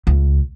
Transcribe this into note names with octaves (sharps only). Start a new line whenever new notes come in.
C#2